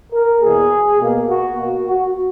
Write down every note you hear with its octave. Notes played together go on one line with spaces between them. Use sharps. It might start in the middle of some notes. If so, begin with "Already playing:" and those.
A#4
E2 B2 A#3 G#4
B2 A#3
F#4
B2 A#3
F#4